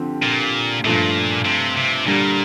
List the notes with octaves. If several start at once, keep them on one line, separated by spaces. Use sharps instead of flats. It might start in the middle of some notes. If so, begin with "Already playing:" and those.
Already playing: D3 F3 C4 G4
A#2
G2 A#2 F3 A3
C3
C3
A#2 D3 G3 D4